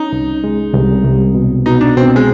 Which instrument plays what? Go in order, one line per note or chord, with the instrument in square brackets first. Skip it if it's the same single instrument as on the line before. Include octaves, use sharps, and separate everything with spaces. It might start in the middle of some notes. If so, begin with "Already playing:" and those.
Already playing: [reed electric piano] C#4 [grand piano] D#4
[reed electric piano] C2
G#3
C2
C2
B2
[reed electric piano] B2 [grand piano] D#4
[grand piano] D4
[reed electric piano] B2 [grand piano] C4
[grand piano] G#3